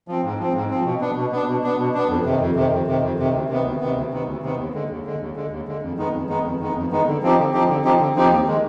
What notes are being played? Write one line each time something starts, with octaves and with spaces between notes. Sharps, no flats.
F3 C4
G#2
F3 C4
G#2
F3 C4
B2
B3 D4
B2
B3 D4
B2
B3 D4
B2
B3 D4
F2
C3 D#3
F2
C3 D#3
F2
C3 D#3
F2
C3 D#3
D2
C3 D#3 B3
D2
C3 D#3 B3
D2
C3 D#3 B3
D2
C3 D#3 B3
D#2
D3 G#3
D#2
D3 G#3
D#2
D3 G#3
D#2
D3 G#3
F2
D#3 G#3 B3 D#4
F2
D#3 G#3 B3 D#4
F2
D#3 G#3 B3 D#4
F2
D#3 G#3 B3 D#4
D3
F3 C4 D#4 G4
D3
F3 C4 D#4 G4
D3
F3 C4 D#4 G4
D3
F3 C4 D#4 G4
D#2
D#3 G#3